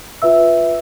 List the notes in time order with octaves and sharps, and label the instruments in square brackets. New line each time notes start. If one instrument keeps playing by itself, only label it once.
[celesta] F4 B4 E5 E6